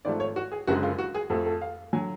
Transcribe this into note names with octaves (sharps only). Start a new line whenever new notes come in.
G#1 G#2 F3 A3 D5
C#5
F#4
G#4
F#1 F#2 D3 G#3 F#4
F4
F#4
G#4
F2 F3 A3 A4
A4
F5
D3 F#3 G#5